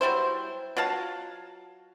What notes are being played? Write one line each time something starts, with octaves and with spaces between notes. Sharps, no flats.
F#3 G3 E4 C5
F#3 F4 F5 A5